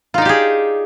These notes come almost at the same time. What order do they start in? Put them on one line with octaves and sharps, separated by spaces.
F4 D#4 D5 G4 G#4